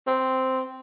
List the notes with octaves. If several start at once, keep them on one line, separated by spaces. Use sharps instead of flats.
C4